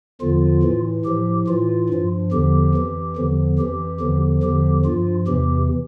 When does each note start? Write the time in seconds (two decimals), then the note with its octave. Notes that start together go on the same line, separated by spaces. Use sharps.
0.21 E2 D3 F3 F4
0.63 A2 E3
1.05 A2 F3 G4
1.48 A2 E3 F4
1.89 G2 F3
2.32 E2 D3 F3 G4
2.75 F2 E3
3.16 E2 D3 F3
3.59 F2 E3 G4
4.00 E2 D3 F3
4.43 E2 D3 F3 G4
4.85 G2 F3 F4
5.27 E2 C3 E3 G4